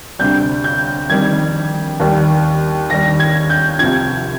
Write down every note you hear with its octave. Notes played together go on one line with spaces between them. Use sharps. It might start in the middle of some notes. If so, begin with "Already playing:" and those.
D2 C3 G3 G6
G6
F2 D#3 G3 G#6
D#2 D#3 G3
D#2 D#3 G3 A#6
G#6
G6
C2 C3 F3 G#6